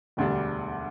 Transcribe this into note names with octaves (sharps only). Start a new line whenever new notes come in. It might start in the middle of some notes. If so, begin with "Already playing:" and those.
E1 D2 D3 G3 D4